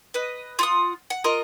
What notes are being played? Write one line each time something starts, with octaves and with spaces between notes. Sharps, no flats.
B4 D#5
F4 F#5 D#6
F#5
F4 A#4 D#5